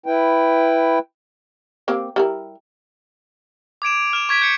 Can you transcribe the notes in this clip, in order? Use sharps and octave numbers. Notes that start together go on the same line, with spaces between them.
E4 B4 G5
A#3 C4 G4
G3 E4 A#4
D6 G#6 D7 E7
F6 E7
C#6 G#6 B6 D7
G6 C#7